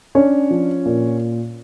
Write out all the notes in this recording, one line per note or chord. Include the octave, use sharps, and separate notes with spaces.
C#4 D4 C#5
F3
A#2